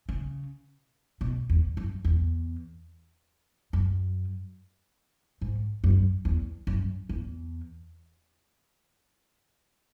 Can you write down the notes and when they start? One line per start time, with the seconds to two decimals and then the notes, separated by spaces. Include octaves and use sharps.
0.09 C#3
1.21 B2
1.50 E2
1.77 F#2
2.05 E2
3.73 F#2
5.41 G#2
5.84 F#2
6.25 E2
6.67 F#2
7.09 E2